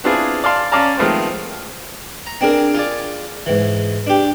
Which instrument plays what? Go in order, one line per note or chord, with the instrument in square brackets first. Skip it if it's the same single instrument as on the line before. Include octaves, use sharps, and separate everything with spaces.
[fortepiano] B3 C4 D4 E4 F4 G#4
D5 F5 A5 C6
C#4 C#5 D5 F5 A5 A#5
D#3 F3 G#3 A3 B3 C4
[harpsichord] A#5
C4 D4 G#4 A#4
F4 G#4 D5
G#2 E3
D4 G4